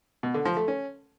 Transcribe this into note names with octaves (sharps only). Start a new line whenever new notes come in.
B2
D3
F3
A3
C#4